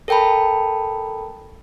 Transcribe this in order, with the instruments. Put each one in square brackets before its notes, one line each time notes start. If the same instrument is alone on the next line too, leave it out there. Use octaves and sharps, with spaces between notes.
[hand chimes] A4 A#4 G5 A5 B5